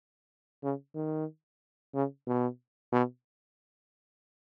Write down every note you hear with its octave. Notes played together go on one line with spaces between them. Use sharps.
C#3
D#3
C#3
B2
B2